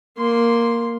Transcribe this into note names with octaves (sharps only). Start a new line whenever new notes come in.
A#3 C6